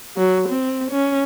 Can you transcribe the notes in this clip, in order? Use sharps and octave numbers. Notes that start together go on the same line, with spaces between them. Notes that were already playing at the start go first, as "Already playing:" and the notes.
F#3
C4
C#4